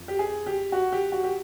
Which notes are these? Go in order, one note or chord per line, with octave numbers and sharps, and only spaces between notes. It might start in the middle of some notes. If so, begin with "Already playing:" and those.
Already playing: F2 F3
G4
G#4
G4
F#4
G4
F#4
G4